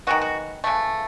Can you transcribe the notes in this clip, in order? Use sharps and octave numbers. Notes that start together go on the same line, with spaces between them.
D#3 G#3 B3 F#4
F#4
C#3 E3 A3